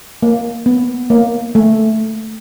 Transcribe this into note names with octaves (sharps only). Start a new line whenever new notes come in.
A#3
B3
A#3
A3